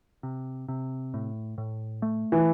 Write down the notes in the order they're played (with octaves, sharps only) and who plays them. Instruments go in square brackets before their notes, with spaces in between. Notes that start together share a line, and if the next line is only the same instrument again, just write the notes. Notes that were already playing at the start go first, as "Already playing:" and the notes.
[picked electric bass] C3
C3
A2
A2
A3
[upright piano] E3